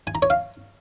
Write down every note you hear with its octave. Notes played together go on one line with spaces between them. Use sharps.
G#5
A#5
C#5
F5